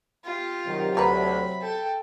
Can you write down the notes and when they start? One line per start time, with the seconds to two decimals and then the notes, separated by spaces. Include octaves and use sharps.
0.25 F4 G4
0.67 C3 D#3 F#3
0.97 D2 F#4 A#4 B4 B5
1.61 A4 G5